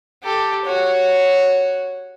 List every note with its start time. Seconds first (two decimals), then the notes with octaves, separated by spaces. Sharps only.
0.23 G4 A4
0.65 F#4 C#5